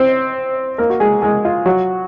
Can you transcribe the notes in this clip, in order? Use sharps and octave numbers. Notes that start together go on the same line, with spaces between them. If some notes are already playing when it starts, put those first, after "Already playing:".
Already playing: C4 C5
A#3 A#4
F#4
G#3 G#4
G#3 G#4
F4
F#3 F#4